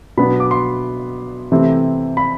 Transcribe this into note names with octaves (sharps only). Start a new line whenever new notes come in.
B2 F#3 B3 D4 B5
D6
C6
C3 E3 A3 C4 E4
B5